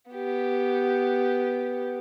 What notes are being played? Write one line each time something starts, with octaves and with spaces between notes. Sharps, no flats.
B3 G4